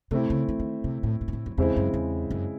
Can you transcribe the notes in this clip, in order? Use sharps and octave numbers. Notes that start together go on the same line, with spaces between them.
C3 A3 C4 E4
C#3
E3
D#3
C3
A2
A2
G#2
A2
F#2
E2 C#3 G#3 C4 E4 C5
F#2
E2
F#2